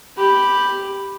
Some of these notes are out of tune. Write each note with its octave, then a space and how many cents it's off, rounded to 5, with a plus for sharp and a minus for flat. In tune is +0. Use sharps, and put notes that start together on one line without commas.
G4 +0 B5 +0